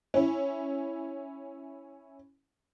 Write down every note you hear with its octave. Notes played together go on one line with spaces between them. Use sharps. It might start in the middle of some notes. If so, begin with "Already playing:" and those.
C#4 E4